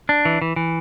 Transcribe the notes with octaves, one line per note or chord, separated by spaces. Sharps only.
D4
E3
E3
E3